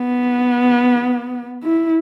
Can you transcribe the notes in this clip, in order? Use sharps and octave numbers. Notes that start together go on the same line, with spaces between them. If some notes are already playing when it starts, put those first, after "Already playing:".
Already playing: B3
E4